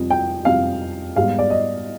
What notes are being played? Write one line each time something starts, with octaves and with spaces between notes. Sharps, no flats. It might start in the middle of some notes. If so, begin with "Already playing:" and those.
Already playing: F2 C3 G3
G5
F2 C3 G3 F5
G#2 G3 B3 F5
D5
D#5